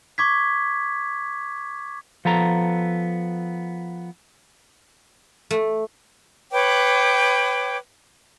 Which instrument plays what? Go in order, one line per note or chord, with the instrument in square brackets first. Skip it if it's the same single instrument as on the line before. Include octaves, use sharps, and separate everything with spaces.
[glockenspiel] C#6 D6 G#6 B6
[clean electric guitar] F3 B3 A4 A#5
[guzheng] A3
[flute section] B4 C#5 G5 D6